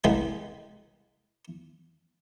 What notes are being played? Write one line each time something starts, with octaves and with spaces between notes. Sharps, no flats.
C2 G#3 G#5